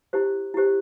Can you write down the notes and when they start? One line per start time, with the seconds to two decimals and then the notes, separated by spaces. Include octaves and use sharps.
0.13 E4 G4 C5
0.54 E4 G4 C5